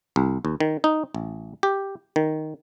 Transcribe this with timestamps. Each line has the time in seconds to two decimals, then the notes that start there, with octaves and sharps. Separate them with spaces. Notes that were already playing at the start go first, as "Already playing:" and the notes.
0.16 C2
0.45 D#2
0.60 D#3
0.84 D#4
1.15 A1
1.63 G4
2.16 D#3